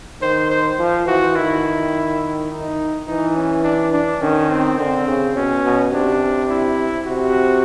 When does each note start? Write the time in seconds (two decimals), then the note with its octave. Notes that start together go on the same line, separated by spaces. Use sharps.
0.21 D#3 C5
0.50 C5
0.79 F3
1.07 E3 F#4
1.36 D#3 E4
2.50 D#4
3.08 E3 D#4
3.36 C#4
3.64 D4
3.93 D4
4.21 D#3 C#4
4.50 C4
4.78 D3 C4
5.07 C#3
5.35 B2 C#4
5.64 B2
5.93 C3 D4
6.50 E4
7.06 C3 F#4